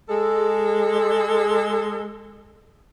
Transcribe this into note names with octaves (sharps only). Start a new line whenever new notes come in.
G#3 A4